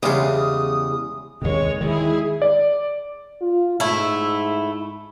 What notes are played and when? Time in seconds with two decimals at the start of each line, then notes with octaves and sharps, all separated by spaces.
0.03 E2 C#3 G3 G#3 F4 D#6
1.42 D#2 C3 G#3 C#5
1.81 D#3 G#3 E4 G#4
2.42 D5
3.41 F4
3.80 G#2 A3 E4